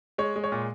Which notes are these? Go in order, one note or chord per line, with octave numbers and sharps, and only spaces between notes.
G#3 C#5
G#3
C#5
A#2